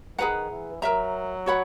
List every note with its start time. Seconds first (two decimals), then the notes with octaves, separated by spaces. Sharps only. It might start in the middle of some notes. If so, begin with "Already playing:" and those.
0.18 D#3 G#4 B4 F#5 A#5
0.50 E3
0.82 F#3 A#4 E5 A#5
1.46 F#4 C#5 F#5 B5